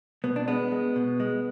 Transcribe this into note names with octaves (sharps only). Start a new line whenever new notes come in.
B2 B3
D4
G#3 B3
G#3
B2
G#3